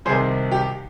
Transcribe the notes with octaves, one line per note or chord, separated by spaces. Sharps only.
C2 C3 D#3 G#4 C5
G4